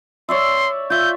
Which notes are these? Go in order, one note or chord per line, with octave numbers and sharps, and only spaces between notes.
C#5 D5 E5 C6
F4 E5 G6